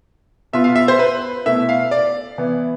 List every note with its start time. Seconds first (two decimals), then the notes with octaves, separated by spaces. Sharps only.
0.53 B2 B3 F4 E5
0.64 F5
0.76 E5
0.88 C5
0.99 B4
1.46 B2 A3 E4 E5
1.69 F5
1.91 D5
2.38 E3 B3 E4